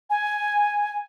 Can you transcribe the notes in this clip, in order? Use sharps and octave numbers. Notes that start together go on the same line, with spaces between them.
G#5